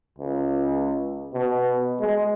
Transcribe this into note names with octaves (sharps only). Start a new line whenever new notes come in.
C#2
B2
G#3